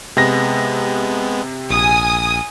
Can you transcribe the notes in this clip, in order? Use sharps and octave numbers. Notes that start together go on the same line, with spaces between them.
C3 G#3 B3 A#6
A#1 G#5 D#6